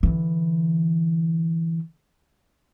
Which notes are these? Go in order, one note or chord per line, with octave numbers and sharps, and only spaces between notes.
D3 E3